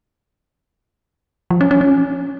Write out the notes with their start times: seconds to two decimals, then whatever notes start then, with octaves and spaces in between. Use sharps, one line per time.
1.50 F3
1.61 C#4
1.71 C#4
1.81 C#4